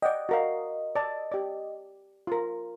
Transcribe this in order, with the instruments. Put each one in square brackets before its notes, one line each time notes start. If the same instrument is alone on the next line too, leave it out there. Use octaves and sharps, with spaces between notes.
[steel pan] D5 F#5 G5 [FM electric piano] D#5
[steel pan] F#4 A#4 F5
D5 A5
G4 D5
F4 A#4